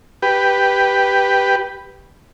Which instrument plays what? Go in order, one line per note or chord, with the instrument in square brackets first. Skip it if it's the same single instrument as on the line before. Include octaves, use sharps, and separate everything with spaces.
[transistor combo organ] G4 B4